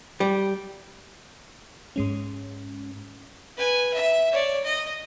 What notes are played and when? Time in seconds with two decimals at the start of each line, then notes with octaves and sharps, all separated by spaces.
0.20 G3
1.96 G#2 G#3 C#4
3.58 B4 G#5
3.94 E5
4.32 C#5 D5
4.64 D#5